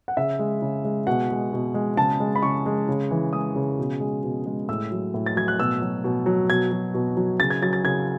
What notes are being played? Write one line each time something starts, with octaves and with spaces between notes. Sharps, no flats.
F#5
C#3 E5
G#3
C#3
G#3
B2 F#5
G#3
B2
G#3
C#3 A5
G#3
B5
C#3 C#6
G#3
C#3
E3
G#3 D#6
C#3
B2
G#3
B2
G#3
A2 E6
F#3
A2
A6
F#3 G#6
F#6
B2 E6
F#3
B2
F#3
B2 G#6
F#3
B2
F#3
C#3 A6
G#6
F#3 A6
A6
C#3 G#6